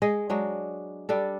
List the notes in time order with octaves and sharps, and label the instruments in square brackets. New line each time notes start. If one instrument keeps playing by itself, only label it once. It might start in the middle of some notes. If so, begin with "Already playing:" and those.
[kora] G#3 G#4 D#5
F#3 G#3 D4
G3 D4 A4